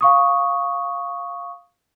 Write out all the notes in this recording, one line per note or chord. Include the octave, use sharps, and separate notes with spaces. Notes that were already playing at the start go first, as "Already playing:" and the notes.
F5 C#6 D#6